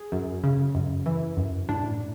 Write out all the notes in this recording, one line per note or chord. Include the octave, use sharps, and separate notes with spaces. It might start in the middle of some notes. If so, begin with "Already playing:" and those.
Already playing: G#4
F#2
C#3
F#2
E3
F#2
A2 D4